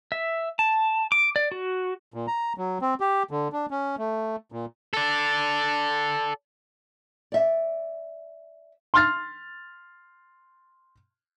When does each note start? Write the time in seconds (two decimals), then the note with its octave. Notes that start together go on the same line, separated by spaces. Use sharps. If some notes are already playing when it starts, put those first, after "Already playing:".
0.12 E5
0.59 A5
1.12 D6
1.36 D5
1.52 F#4
2.14 A#2
2.27 A#5
2.58 F#3
2.81 C4
3.00 G4
3.31 D3
3.53 D4
3.71 C#4
3.98 A3
4.52 A#2
4.93 A4 D5
7.32 D5 E5
8.94 C6 F6 A6